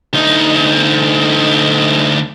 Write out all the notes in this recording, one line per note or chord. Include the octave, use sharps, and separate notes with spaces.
D2 D#4